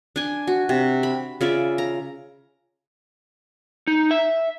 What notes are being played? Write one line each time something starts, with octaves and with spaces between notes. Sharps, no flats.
D4 G#5
F#4
C3
B5
C#3 F4 D5 E5
A#5
D#4
E5